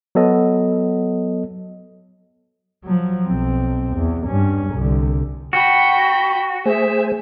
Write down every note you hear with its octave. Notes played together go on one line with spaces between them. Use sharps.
F#3 B3 A4 D#5
F3 F#3
B1 C4
E2
G2 C#4
C2 D3
F#4 G5 B5
A3 G#4 C5 E5 G#5